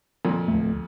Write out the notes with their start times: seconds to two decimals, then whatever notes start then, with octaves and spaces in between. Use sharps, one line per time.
0.25 F2 A#2
0.48 D1 G#1 A3